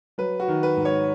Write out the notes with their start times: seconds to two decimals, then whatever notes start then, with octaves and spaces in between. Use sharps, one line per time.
0.18 F#3 B4
0.40 F#4
0.48 D#3
0.63 B4
0.77 G#2
0.85 C#5